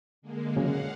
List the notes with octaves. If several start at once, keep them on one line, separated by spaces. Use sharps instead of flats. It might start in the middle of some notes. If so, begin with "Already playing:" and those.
D3 G#3 A#3
C#3 F#3 F5 F#5